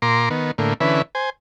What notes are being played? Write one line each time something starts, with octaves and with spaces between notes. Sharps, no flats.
A#2 A#5 C6 D6
D#3 B3
A2 D3 A#3
D3 E3 C#4 B4 E5
C5 G#5